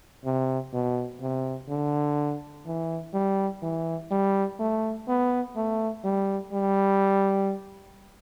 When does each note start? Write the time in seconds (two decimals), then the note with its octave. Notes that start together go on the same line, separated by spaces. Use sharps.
0.25 C3
0.73 B2
1.21 C3
1.69 D3
2.66 E3
3.14 G3
3.62 E3
4.11 G3
4.59 A3
5.08 B3
5.56 A3
6.05 G3
6.53 G3